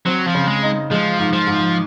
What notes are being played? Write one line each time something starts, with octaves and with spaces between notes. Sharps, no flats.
F#3 C4
F3
C#3
G#3
D#4
F3 G#3
G#2
F3
G#2